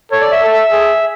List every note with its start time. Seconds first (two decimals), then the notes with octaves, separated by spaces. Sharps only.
0.12 A4 C#5
0.21 D5
0.32 E5
0.42 A4
0.72 G#4